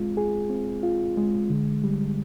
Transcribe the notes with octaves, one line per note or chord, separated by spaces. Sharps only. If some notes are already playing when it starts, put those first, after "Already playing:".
Already playing: G#3 C4 F4
G#4
C4
F4
G#3
D3
G3